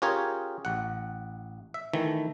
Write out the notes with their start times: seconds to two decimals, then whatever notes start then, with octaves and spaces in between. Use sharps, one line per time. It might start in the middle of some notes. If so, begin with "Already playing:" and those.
0.02 C#4 F4 G4 G#4 A#4 C#5
0.65 A1 F#5
1.74 E5
1.94 D#3 E3 A3